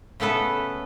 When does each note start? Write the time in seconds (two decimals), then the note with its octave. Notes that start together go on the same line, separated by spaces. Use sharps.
0.20 C#3 A3 B3 A4 B4